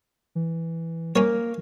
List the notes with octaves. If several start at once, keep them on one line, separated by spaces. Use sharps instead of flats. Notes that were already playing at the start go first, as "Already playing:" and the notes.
E3
A#3 C#4 C#5